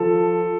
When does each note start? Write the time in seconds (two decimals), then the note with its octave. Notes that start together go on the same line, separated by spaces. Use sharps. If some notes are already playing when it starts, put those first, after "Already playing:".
Already playing: F3 A4